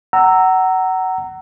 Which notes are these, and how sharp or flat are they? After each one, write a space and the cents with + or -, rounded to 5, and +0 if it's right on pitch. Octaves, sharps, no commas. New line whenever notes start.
F#5 +25 A#5 -15 E6 +0